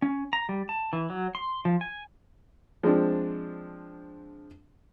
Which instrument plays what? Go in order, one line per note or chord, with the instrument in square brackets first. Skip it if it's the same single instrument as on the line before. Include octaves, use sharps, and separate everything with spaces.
[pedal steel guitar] C#4
A#5
G3
A5
E3
F#3
C6
F3
G#5
[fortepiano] F3 G#3 C4 D4